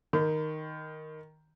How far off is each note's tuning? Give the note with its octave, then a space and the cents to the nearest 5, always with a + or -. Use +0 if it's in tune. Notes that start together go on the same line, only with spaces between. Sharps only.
D#3 +0 B5 +45